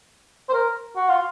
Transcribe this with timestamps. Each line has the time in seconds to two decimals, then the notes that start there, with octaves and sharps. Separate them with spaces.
0.49 C5
0.53 A#4
0.96 F#4
1.09 F4